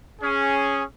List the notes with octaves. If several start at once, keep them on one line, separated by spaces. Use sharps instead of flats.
C#4 G#4